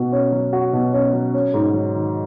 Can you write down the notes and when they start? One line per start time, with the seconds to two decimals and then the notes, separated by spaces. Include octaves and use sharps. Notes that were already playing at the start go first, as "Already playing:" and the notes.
Already playing: B2 F#4
0.12 C#4
0.32 F#3
0.53 F#4
0.73 B2
0.93 C#4
1.13 F#3
1.34 C#4
1.54 G#2
1.74 F#3
1.94 D#3